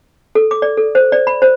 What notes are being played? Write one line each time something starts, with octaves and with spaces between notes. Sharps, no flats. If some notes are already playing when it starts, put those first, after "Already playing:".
A4
D6
D5
A4
C5
D5
B5
C5